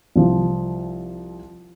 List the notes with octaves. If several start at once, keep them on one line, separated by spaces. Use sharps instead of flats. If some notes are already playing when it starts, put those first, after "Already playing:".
C2 F3